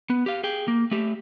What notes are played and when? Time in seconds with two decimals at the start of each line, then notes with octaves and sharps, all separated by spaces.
0.10 B3
0.26 G4 F5
0.44 G#4 G5
0.68 A#3
0.91 A3 G4